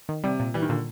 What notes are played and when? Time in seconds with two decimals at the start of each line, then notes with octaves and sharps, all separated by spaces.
0.09 D#3
0.24 C3 G3
0.39 A#2
0.54 E3 G3
0.62 D#3
0.69 A#2 D3